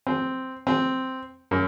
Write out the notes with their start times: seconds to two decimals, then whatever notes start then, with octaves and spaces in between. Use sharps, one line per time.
0.07 C4
0.67 C4
1.51 F#2